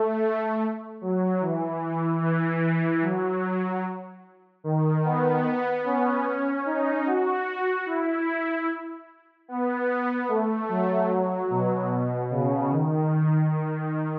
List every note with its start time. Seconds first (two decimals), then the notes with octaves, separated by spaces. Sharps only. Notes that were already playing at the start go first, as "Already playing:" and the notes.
Already playing: A3
1.01 F#3
1.41 E3
2.21 E3
3.02 F#3
4.64 D#3
5.05 B3
5.84 C#4
6.66 D#4
7.06 F#4
7.86 E4
9.48 B3
10.29 A3
10.69 F#3
11.09 F#3
11.50 B2
12.30 C#3
12.71 D#3
13.51 D#3